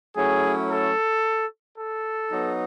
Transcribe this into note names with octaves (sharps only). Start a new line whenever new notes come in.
F#3 A3 C#4 E4 G#4
A4
A4
F#3 B3 D#4